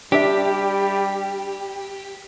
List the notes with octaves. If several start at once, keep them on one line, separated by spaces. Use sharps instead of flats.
G3 D4 G4 E5